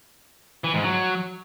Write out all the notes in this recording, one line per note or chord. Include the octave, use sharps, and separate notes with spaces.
E3
G#2
F#3